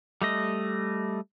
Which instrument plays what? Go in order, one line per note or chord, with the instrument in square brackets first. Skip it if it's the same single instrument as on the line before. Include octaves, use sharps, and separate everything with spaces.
[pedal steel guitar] G3 A3 D#5